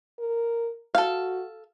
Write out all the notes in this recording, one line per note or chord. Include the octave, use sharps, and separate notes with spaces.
A#4
F#4 A4 F5